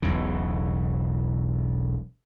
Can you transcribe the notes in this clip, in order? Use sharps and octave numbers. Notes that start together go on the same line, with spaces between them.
E1 B1 E2 C#3